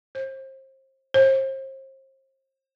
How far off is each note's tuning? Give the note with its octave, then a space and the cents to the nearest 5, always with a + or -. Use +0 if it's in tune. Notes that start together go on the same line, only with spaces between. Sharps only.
C5 +30
C5 +35